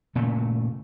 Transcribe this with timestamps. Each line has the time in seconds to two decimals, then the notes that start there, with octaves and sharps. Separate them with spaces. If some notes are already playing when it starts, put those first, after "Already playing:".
0.15 A#2 C#3 A3